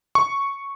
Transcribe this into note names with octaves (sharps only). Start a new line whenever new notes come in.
C#6